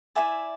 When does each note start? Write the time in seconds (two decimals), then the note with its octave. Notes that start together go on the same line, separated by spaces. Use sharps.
0.15 E4 B4 D5 E5 G#5